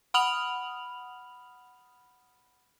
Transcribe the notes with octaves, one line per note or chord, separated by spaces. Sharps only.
F#5 B5 D#6 F6 F7 F#7